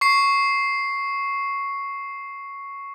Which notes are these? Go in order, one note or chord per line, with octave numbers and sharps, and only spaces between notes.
C#6 C7